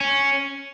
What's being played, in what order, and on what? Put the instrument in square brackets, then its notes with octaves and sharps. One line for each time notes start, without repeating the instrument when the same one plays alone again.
[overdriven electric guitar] C#4